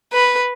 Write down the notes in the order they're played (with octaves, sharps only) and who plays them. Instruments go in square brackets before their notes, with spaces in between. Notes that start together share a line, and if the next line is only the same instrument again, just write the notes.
[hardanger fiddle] B4